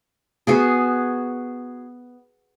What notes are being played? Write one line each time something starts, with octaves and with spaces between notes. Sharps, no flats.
B3 F#4 G#4